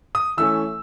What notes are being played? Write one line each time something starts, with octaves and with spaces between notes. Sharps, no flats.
D#6
E3 A3 C#4 E6